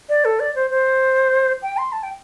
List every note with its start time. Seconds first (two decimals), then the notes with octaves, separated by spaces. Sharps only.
0.09 D5
0.25 A4
0.40 D5
0.55 C5
0.71 C5
1.62 G5
1.78 C6
1.92 A5
2.03 G5